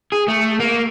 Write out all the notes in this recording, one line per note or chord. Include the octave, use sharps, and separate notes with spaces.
G#4
A3
A#3